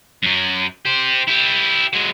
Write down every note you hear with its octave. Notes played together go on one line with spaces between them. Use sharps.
F#2 F#3
G4 C5
E4 G4
F#3 G#3